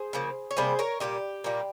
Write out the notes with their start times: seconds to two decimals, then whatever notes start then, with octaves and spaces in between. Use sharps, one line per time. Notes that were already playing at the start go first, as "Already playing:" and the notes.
Already playing: G#4 C5
0.13 C#3 F3 A#3
0.51 C#5
0.57 C3 G3 A#3 G#4 C5
0.79 A#4 C#5
1.00 A#2 G3 A#3 D#4 G4
1.44 A#2 G3 A#3